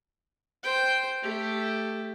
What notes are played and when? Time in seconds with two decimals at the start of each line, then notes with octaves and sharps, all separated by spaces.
0.63 C5 G5
1.23 A3 G4